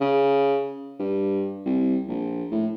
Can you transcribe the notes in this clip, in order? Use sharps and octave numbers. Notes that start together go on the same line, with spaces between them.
C#3
G2
C2
A#1
A2